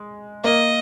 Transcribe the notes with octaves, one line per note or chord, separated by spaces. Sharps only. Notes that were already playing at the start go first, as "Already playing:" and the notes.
Already playing: G#3
A#3 D#5